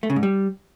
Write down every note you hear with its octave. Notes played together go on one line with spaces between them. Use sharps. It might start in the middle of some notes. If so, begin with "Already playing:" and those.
A3
C#3
G#2
G3